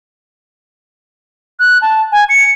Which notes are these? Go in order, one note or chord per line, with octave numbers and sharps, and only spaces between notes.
F#6
A5
G#5
C#7